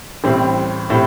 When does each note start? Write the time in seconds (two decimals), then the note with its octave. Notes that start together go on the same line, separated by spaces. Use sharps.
0.24 A1 A2 G3 C4
0.90 A2 G3 C4